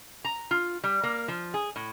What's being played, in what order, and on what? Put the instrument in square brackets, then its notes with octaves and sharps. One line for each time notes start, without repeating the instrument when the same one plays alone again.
[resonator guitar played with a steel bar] A#5
F4
G3
A#3
F3
G#4
A2